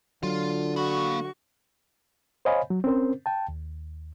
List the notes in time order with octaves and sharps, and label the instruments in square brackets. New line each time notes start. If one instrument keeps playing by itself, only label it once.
[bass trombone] D3 [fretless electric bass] F#3 [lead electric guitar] F4
[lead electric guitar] A#3 B5 [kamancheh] F#4 C#6
[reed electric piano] C5 C#5 D#5 F5 G#5 B5
F#3
C4 C#4 A#4 C5
G5 A5
D#2